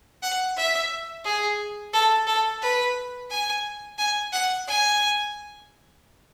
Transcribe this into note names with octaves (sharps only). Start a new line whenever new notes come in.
F#5
E5
G#4
A4
A4
B4
G#5
G#5
F#5
G#5